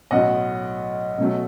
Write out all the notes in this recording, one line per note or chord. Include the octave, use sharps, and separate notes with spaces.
B1 A2 F#3 D#5 F#5
B1 B2 F#3 A3